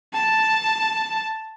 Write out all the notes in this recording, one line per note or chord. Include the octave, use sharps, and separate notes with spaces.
A5